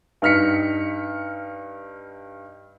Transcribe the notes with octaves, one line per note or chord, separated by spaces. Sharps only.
G2 D#4 F6 B6 C#7